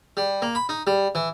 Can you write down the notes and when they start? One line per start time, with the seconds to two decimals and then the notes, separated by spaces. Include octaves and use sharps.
0.17 G3
0.42 A#3
0.55 B5
0.69 D#4
0.87 G3
1.15 E3